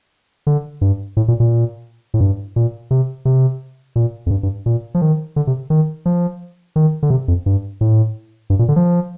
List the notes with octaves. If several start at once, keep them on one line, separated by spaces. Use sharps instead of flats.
D3
G2
A2
A#2
A#2
A2
G2
A#2
C3
C3
A#2
F2
G2
G2
A#2
F3
D#3
D3
C3
D#3
F3
D#3
D3
C3
F2
G2
A2
G2
A#2
D3
F3